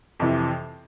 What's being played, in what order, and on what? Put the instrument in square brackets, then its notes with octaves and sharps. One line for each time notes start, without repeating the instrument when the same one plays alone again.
[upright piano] F2 C3 E3